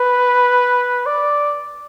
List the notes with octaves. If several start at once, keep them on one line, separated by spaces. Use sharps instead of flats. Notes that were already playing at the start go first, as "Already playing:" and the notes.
Already playing: B4
D5